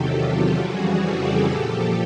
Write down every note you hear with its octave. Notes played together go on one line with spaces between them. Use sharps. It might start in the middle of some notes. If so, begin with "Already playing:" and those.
Already playing: E2 C3 D#3 F#3 G4 A4
F4 G4
F2 C#3 E3 G3 F#4 G#4
G4 A4
A#2 F3